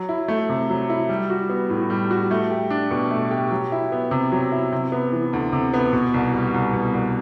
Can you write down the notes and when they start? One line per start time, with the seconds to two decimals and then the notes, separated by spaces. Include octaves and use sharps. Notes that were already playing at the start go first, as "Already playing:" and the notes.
Already playing: F#3
0.09 E4
0.28 A3
0.49 C3
0.70 F#3
0.90 E4
1.09 G3
1.30 F#4
1.50 B3
1.70 A2
1.90 G3
2.11 F#4
2.31 A3
2.51 G4
2.70 D4
2.91 B2
3.11 A3
3.31 G4
3.51 F#3
3.72 E4
3.92 B3
4.11 C3
4.32 F#3
4.52 E4
4.72 C3
4.92 B3
5.12 E3
5.33 D2
5.52 C3
5.74 B3
5.93 B2
6.14 C2
6.34 G3
6.54 C2
6.73 B2
6.94 C2